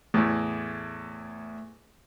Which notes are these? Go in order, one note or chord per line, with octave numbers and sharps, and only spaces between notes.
E2 A2 A3